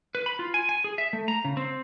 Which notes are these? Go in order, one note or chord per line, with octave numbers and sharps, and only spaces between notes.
B4
B5
F4
G#5
G#5
G#4
E5
A3
A#5
C#3
C4